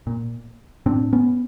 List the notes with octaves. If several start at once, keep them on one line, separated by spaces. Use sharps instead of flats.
A#2
A2 C4 D4
B3 C#4